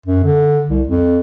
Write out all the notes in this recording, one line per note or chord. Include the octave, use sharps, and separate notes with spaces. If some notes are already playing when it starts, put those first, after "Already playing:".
F#2
D3
C2
F2